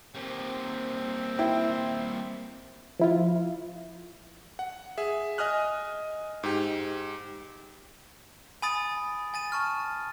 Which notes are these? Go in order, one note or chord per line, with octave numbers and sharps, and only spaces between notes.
G3 A#3 C4
E4 G5
F3 E4 F4
F#5
G#4 E5
D#5 G#5 D#6 F6 F#6
G#2 G4
G#5 B5 D#6 A6 D7
G#5 A6 D#7
A5 C#6 F6